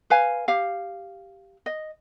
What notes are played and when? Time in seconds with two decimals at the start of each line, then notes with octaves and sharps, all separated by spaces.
0.10 B4 F5 G#5
0.48 G4 F5
1.66 D#5